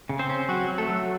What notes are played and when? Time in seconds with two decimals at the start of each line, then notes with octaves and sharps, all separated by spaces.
0.09 C#3
0.19 C4 C5
0.29 C#4
0.49 F#3 C4 F#4
0.68 F#3
0.78 A3 A4
0.88 F#3